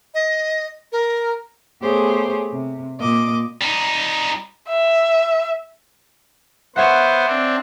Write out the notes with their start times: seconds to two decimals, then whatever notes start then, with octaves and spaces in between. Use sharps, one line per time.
0.14 D#5
0.92 A#4
1.83 A3 B3 G4 G#4 C5 C#5
2.52 C3
2.98 A#2 D#5 D6
3.61 G3 D#4
4.69 E5
6.76 B3 C5 C#5 E5 F#5
7.27 C4 D4